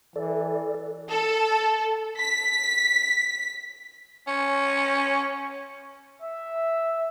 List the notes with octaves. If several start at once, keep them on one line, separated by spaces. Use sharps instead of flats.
E3 A4 D5
A4
B6
C#4
E5